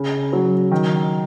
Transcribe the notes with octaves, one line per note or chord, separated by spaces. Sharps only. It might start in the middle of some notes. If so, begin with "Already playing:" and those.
Already playing: C#3
F#3
D#3